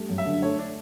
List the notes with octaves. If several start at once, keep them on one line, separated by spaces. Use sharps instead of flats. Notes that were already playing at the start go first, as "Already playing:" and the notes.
Already playing: G3 A3
F#2
E5
D3
A3 C#5
D4